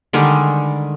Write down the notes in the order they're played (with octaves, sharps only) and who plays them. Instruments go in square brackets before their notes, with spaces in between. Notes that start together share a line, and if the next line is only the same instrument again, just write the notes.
[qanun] D3 D#3 G3 G#3